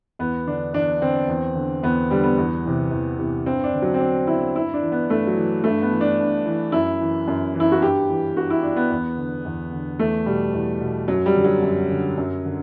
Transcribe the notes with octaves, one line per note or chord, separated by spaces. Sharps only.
E2 B3
D3 D4
E2 D4
D3 C4
E2
D3
E2 B3
D3 G3
B3
E2
C3 E3
E2
C3 E3
G2 C4
D4
D3
F#3
C4
G2 D4
D3 E4
G2 E4
D4
E3
B3
G2 A3
F#3
E3
G2 A3
B3
E3
D4
G2
E3
F#2 E4
E3
F#2
E3
E4
F#4
G2 G4
E3
G2 F#4
E4
E3 D4
B3
E2
D3
E2
D3
E2 A3
B2 G3
E2
B2
F#2 F#3
G3
D3
F#3
F#2
D3
F#2
D3